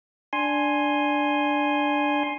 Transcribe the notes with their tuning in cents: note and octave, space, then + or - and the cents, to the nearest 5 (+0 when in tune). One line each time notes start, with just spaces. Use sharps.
D4 +0 G#5 +0 C6 +15